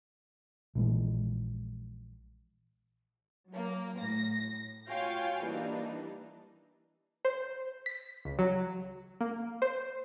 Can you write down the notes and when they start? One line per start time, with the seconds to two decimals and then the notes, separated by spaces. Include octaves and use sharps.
0.75 A#1 E3 G#3
3.50 F#3 A#3
3.98 A2 A#6
4.87 F4 F#4 C#5 F5 G5 G#5
5.44 E3 G3 A#3 D4 D#4
7.25 C5
7.86 B6
8.25 C#2
8.39 F#3
9.21 A#3
9.62 C5